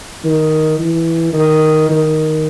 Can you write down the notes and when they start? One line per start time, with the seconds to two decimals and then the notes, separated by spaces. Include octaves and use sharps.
0.24 D#3
0.78 E3
1.33 D#3
1.89 D#3